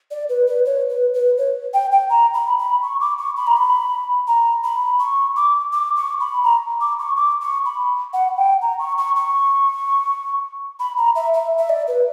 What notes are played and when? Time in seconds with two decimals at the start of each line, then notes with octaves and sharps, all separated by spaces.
0.11 D5
0.29 B4
0.47 B4
0.66 C#5
0.89 B4
1.14 B4
1.38 C#5
1.74 G5
1.92 G5
2.10 A#5
2.34 B5
2.59 B5
2.83 C#6
3.00 D6
3.18 C#6
3.37 B5
3.47 A#5
3.57 B5
4.28 A#5
4.64 B5
5.00 C#6
5.36 D6
5.73 D6
5.96 C#6
6.20 B5
6.44 A#5
6.81 D6
6.99 C#6
7.16 D6
7.41 C#6
7.66 B5
8.13 F#5
8.37 G5
8.62 A#5
8.79 C#6
8.98 C#6
9.16 C#6
10.80 B5
10.97 A#5
11.16 E5
11.34 E5
11.58 E5
11.69 D5
11.88 B4